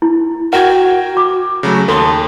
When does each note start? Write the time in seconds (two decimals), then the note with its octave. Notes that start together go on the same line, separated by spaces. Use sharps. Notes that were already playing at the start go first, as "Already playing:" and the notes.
0.02 E4
0.53 F#4 A#4 F#5 G5 G#6
1.17 D6
1.63 C#3 F#3 A3
1.88 D#2 A4 A5 C6